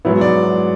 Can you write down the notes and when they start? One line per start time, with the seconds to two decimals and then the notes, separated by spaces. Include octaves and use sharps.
0.05 G#2 F#3 B3 E4
0.21 D5